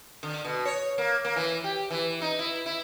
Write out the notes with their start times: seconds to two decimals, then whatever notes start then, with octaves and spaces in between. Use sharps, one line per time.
0.23 D3
0.45 B2
0.66 C#5
0.98 A#3
1.25 A#3
1.36 E3
1.64 G4
1.91 E3
2.22 D#4
2.39 E4
2.66 E4